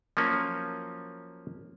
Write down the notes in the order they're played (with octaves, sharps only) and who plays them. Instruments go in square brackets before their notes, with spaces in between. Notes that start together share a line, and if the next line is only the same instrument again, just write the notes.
[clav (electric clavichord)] F3 F#3 A#3 C#4